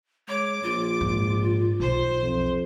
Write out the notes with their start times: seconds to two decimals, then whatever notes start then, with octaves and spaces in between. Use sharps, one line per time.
0.28 G#3 C#5 D6
0.63 A#1 F4
1.01 G#2
1.80 B1 C5
2.22 F2